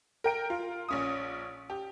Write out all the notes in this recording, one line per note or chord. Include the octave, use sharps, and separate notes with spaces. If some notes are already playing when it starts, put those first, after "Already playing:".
A#4 G5 D7
F4
A#1 C#4 D#6
G4